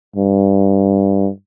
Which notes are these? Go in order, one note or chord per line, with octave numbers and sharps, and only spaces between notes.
G2